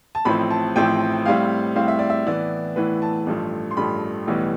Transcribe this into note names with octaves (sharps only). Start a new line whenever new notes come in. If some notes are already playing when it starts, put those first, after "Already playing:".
A5
A1 A2 F3 C4 E4 B5
A5
A1 A2 F3 C4 E4 G5
A2 G3 C4 E4 F5
A2 G3 C4 E4 F5
E5
D5
E5
A2 E3 B3 E4 D5
A2 E3 B3 E4 B4
A5
A1 G2 F3 A3
C6
A1 G2 F3 A3 B5
B1 A2 E3 G3 B3